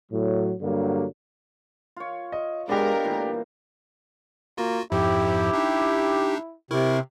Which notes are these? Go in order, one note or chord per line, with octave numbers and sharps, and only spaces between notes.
A2 F#3
G2 D3 F#3 G3 A#3
F4 C#5
D#5
G#3 B3 D4 G4 A#4 D#5 F5
A#2 E3 G3 A3
A#3 F4 F#4
F2 G#2 F3 E4 G4
D4 D#4
C3 E4 A#4 C#6